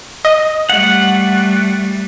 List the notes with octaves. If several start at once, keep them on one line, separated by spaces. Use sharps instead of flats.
D#5
G3 A3 F#5